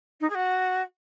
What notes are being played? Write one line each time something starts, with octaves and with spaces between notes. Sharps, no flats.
D#4
G#4
F#4